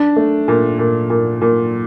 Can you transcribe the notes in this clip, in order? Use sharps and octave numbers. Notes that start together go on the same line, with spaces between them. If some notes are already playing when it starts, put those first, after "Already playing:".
Already playing: D4
A3
A#2
A#2
A#2
A#2